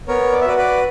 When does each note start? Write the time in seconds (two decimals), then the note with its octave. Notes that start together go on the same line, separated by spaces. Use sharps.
0.08 B3 A#4 C#5
0.32 D5
0.41 E5
0.45 F#4 B4 D5
0.58 B4 D5